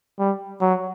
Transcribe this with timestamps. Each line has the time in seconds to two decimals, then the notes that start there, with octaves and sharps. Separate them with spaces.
0.19 G3
0.61 F#3